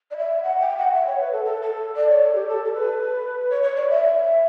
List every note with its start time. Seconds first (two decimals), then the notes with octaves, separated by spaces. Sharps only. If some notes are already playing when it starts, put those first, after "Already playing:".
0.11 D5
0.17 E5
0.43 F#5
0.60 G5
0.77 F#5
0.94 E5
1.07 C#5
1.20 B4
1.32 A4
1.45 A4
1.62 A4
1.96 D5
2.09 C#5
2.23 A4
2.34 G4
2.48 A4
2.65 A4
2.74 B4
3.50 C#5
3.63 C#5
3.75 D5
3.89 E5